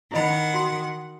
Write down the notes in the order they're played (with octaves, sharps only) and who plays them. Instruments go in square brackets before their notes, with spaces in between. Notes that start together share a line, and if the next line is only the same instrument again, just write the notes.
[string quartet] D#3 F#5 [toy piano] E4 D#5 B5
[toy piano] F#4 C6